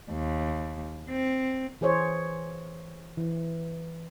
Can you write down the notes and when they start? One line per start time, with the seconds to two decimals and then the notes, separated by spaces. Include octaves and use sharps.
0.10 D#2
1.09 C4
1.81 E3 G#4 C5 C#5
3.17 E3